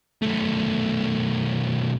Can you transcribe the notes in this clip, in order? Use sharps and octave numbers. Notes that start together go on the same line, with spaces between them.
B1 A3